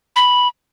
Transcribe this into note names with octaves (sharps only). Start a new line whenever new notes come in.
B5